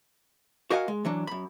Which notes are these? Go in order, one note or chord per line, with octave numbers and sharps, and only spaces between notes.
F#4 A#4 D#5 F5 F#5 G#5
G#3
E3 F#3 D4
F#2 B5